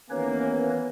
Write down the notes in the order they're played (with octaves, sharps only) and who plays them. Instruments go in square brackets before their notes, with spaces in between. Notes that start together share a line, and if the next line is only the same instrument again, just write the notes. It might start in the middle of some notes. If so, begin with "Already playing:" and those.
[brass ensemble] D#2 A#3 [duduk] E3 [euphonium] B3 [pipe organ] C#4 B4 C#5